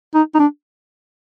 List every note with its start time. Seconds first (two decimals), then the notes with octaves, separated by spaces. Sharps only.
0.15 D#4
0.34 D#4
0.39 D4